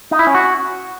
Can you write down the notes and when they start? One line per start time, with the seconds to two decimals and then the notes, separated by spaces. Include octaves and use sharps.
0.11 D#4
0.19 E4
0.27 C#4
0.35 F#4